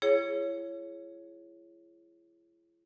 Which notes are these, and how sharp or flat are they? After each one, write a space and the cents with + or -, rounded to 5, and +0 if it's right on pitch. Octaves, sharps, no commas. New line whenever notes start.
E4 +40 G#4 +0 C#5 +0